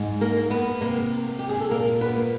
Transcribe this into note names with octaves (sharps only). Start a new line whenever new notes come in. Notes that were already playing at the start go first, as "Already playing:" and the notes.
Already playing: G#2
A#3 A#4
A#3
B3 B4
C3 A#3 A#4
A#3
G4
G#4
A4
A#2 A#3 A#4
B3 B4
A#3